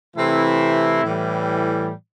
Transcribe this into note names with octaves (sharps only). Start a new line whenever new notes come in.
C3 E3 A3 C4 E4
A2 E3 G3